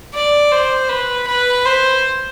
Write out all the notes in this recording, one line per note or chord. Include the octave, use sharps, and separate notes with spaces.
D5
C5
B4
B4
C5